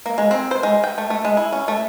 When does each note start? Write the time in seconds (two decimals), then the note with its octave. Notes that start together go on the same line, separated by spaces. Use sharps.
0.06 A#3
0.18 G#3
0.31 C4
0.51 C5
0.63 G#3
0.84 G5
0.98 A3
1.10 A3
1.25 G#3
1.37 E4
1.52 C#4
1.68 A3